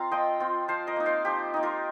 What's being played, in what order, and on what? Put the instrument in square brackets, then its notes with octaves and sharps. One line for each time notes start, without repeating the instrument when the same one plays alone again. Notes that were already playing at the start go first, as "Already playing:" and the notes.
Already playing: [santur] C4 F4 F5 A#5
F3 D#5 G5
C4 F4
F3 C5 F5
A#4 D#5
A#3 D#4
C5 F5
F3 G4
A#3 D#4
F4 A#4